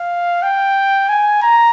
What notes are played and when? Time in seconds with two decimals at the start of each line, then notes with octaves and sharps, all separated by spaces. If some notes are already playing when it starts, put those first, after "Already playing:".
Already playing: F5
0.43 G5
1.09 G#5
1.42 A#5